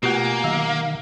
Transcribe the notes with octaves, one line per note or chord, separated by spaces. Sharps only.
B2 A3 A#3 F4 G4 F#5 G#5
D#3 F#3 F5